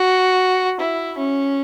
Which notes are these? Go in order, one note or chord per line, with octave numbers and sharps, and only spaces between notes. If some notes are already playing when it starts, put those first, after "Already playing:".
Already playing: F#4
E4
C#4